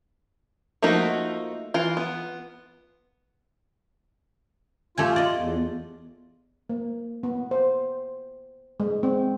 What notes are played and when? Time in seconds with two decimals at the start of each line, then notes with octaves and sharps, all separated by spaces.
0.82 F3 A3 A#3 D#4 F#4
1.74 E3 F4
1.97 B3
4.98 A3 F4 G4 G#5
5.16 D5 D#5
5.36 E2
6.69 A#3
7.23 B3
7.51 C5
8.80 G#3
9.03 C4